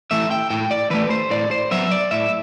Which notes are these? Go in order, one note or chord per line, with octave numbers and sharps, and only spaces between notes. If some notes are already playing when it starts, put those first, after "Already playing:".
E3 A3 E5
G5
A2 G5
D5
E3 A3 B4
C5
A2 D5
C5
F#3 B3 E5
D5
A2 E5